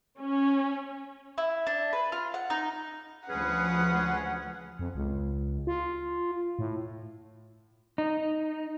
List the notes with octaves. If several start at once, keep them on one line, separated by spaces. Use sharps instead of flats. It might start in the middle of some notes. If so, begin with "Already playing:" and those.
C#4
E4
D4
B4
F4
F#5
D#4
D2 F3 C#4 G#4 B4 F#5
F2
C#2
F4
A2
D#4